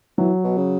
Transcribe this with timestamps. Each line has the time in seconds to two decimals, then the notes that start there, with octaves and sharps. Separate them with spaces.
0.18 E3 F#3
0.44 B2
0.57 C#3